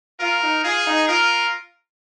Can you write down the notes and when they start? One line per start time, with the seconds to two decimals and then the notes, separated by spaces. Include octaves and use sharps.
0.20 F4 A#4
0.42 D#4
0.64 F4 G#4
0.86 D#4
1.08 F4 A#4